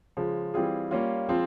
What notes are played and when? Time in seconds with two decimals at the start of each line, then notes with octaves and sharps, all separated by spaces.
0.17 C#3 F3 G#3
0.54 E3 G3 C4 F4 G#4
0.91 G3 A#3 C#4 F4
1.29 F3 G#3 C4 F4